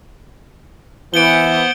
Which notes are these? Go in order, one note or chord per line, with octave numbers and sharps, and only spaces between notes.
E3 B3 C5 F#5 D7 G7